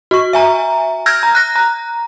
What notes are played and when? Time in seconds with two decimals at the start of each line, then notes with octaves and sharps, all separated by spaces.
0.11 F#4 C#6
0.33 E5 G#5 A#5
1.06 E6 F6 G6 G#6 A#6
1.23 A#5
1.35 F#6 A#6
1.56 A#5